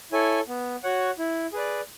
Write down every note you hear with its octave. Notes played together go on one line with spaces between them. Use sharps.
E4 A4 C#5 G#5
B3
F#4 C#5 F#5
E4
G#4 B4 D5